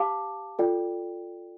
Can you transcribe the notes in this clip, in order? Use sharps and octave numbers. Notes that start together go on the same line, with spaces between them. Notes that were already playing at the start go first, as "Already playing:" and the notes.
Already playing: G4 F5 A5 D6
F4 A4 D5 G5